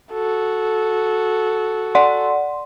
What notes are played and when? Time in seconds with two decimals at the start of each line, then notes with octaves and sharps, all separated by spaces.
0.12 F#4 A4
1.95 D5 F#5 C6